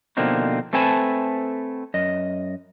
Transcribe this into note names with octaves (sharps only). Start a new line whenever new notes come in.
B2 D3 F3 A#3 C4 D#4
A3 C4 A4 B4 G#5 A5
F#2 D#5